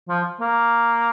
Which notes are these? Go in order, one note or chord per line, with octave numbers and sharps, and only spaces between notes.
F3
A#3